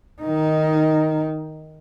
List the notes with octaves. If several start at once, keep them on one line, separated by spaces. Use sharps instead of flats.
D#3 D#4